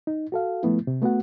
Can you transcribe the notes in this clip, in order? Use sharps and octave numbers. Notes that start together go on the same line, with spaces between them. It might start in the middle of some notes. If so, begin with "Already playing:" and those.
D#4
F#4 A4 F5
F3 A3 B3 E4
C3
A3 B3 F#4 F#5